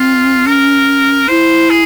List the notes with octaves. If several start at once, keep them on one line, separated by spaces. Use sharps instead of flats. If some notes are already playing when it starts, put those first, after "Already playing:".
Already playing: C4 F4
C#4 A#4
E4 C5
G#4